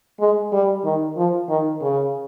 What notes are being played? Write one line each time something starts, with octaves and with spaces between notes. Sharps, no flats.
G#3
G3
D#3
F3
D#3
C#3